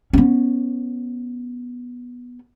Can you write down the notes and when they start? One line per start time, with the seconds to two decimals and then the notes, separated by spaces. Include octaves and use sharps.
0.13 B3 C#4